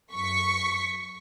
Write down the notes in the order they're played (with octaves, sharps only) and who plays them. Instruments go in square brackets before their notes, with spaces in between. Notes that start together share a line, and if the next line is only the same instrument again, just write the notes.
[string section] F#2 C#6 B6